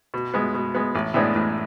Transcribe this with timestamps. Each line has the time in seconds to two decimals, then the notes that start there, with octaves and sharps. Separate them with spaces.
0.14 B2
0.34 G#3 B3
0.54 B2
0.75 G#3 B3
0.95 A1
1.14 A2 G#3 B3 D4
1.35 A1